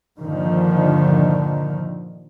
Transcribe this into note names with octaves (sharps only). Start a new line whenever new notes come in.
G2 A#2 D3 D#3 F3